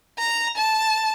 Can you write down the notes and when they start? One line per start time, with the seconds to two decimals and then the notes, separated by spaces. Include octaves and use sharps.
0.18 A#5
0.57 A5